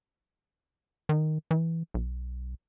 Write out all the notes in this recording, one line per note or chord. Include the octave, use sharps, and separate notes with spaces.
D#3
E3
B1